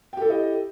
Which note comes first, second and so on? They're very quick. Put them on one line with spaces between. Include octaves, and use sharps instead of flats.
G5 G4 A4 E4 D#5